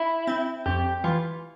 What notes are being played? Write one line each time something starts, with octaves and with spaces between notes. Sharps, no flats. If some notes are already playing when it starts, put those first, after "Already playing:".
Already playing: E4
C4
F2 G4
E3 F4